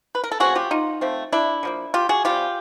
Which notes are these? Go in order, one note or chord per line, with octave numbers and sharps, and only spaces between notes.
B4
A#4
A4
C#3 F3 A3 C4 F#4 G#4
F4 G4
D#4 F4
F3 A3 C4
D4 E4
D3 F3 A#3
F4 G4
F#4 G#4
C3 D#3 G3 F4 G4